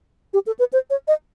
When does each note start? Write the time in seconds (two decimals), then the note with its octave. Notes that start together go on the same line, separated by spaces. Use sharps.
0.33 G4
0.47 A4
0.59 B4
0.73 C5
0.90 C#5
1.08 D#5